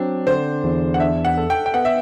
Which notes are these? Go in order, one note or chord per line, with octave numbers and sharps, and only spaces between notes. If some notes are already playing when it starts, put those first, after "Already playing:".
Already playing: F#3 C4 D4
D3 C5
E2
F#5
D4 E5
F#5
A4
G5
G5
B3 F#5
E5